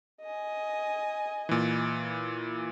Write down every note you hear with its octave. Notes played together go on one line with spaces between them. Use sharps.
D#5 G#5
A#2 E3